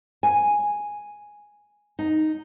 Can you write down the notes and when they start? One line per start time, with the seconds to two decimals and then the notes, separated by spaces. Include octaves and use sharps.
0.23 G#5
1.99 D#4